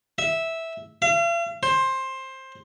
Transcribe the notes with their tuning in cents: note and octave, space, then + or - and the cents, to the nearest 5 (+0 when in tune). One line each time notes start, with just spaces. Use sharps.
E5 -10
F5 -45
C5 +15